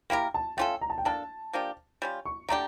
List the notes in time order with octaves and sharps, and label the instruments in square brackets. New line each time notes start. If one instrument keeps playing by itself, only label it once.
[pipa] A#3 E4 G4 A#4 [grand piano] G5
[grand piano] A5
[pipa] A3 C#4 F4 A4 [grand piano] G5
[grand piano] A#5
A5
G5
[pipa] A#3 D4 A4 [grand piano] A5
[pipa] F3 A#3 D4 G4
G3 C#4 F4
[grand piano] C#6
[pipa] D3 A3 D4 G4 [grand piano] A#5